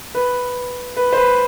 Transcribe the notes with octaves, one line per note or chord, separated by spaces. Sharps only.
B4
B4
C5
B4